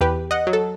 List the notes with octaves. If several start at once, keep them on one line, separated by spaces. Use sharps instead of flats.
E2 G4 B4
D#5 F#5
F#3
A4